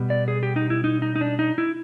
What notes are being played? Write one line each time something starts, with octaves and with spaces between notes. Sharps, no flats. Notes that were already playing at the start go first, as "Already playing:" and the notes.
Already playing: B2 G3 B3
D5
G#4
G4
D#4
E4
D#4
D#4
D#4
D4
D#4
E4